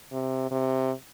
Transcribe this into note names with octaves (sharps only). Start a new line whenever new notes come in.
C3
C3